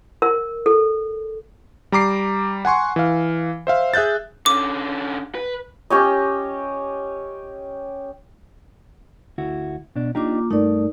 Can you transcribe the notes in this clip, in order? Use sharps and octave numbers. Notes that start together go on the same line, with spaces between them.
A#4
A4
G3 A#5 D6 C7
F#5 G#5 C6 C#6
E3 F5
C5 E5 F5
G#4 E5 F#6 G6 A6
D3 C#4 D6
B4
C#4 G4 C#5 D#5
D2 E4 F#4
B2 D4
A#3 D4 D#4 F4 G4 D6
G2 A3 D#4 A#4 D5